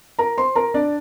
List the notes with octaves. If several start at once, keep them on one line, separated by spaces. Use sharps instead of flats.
A#4 A#5
C5 C6
A#4 A#5
D4 D5